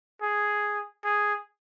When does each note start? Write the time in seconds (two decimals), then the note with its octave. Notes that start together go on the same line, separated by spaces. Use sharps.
0.22 G#4
1.05 G#4